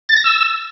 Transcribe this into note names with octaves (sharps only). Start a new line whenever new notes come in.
A6
A#6
E6